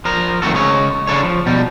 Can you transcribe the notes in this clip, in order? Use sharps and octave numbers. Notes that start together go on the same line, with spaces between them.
F3 A#4
D#3 A3 C4 F#4 A4
C#3 G#3 C#5
C#3 D4 A4 C#5
F3
B2 G3